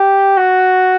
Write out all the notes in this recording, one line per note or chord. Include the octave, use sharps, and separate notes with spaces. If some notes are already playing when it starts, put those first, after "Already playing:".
Already playing: G4
F#4